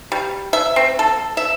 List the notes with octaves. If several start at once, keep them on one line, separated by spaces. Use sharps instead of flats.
G3
E5
C4
A4
E5